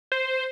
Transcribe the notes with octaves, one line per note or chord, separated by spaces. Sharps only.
C5